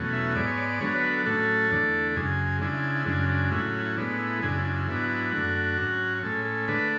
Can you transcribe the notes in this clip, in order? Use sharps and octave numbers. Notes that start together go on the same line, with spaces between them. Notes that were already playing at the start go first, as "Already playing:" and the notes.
Already playing: E2 B2 F#3 A3 C#4
E5
G#2 G#3 B3 D5
C#5
D5
D5
D3 F#3 B3 D4 C#5
B4
A4
A2 F#3 A3 C#4 A4
E2 D3 A3 D4
F#2 C#3 G#3 G#4
C#3 G#3 D4 E4
E4
E4
E4
F#2 C#3 G#3 D4
D4
A2 F#3 C#4 E4
E4
E4
A2 G#3 B3 D4
E4
F#2 C#3 G#3 D4 G#4
E4
D4
E4
G#2 F#3 B3 D4 E4
E4
F#2 D3 A3 D4 F#4
G#2 F#3 C#4
A2 G#3 C#4 A4
A4
D3 A3 D4 B4